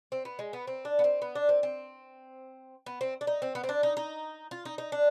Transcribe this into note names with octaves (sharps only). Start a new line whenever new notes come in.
C4
B3
G#3
B3
C4
D4
B3
C4
B3
D4
C4
C4
B3
C4
D4
D#4
C4
B3
C4
D4
D#4
D#4
F4
D#4
D#4
D4